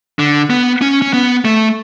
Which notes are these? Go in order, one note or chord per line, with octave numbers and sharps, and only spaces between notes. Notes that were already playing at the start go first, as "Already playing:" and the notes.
D3
B3
C#4
C#4
B3
A3